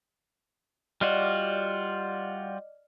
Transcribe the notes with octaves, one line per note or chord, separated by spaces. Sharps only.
G3 F4 F#4 D5 D#5 F6